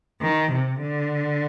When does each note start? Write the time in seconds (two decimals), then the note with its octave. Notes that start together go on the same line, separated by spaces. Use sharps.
0.21 D#3
0.52 C3
0.81 D3